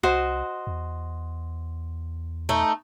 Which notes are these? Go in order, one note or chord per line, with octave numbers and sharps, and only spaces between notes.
C2 F#4 C5 D#5
E2
A3 D#4